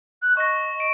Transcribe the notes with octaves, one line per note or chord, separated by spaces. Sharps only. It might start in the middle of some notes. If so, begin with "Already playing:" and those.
F#6
D#5 C#6 A#6
D7